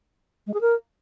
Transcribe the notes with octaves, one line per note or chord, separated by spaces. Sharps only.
G#3
G#4
A#4